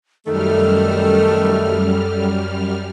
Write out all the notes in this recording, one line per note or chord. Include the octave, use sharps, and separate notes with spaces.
F#2 D#3 G3 A3 A4 F6